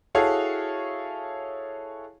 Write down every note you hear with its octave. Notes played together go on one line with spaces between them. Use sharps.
E4 F#4 G#4 A4 C#5 F5